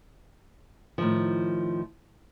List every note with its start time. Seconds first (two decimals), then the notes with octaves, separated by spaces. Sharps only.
0.98 A2 D#3 F3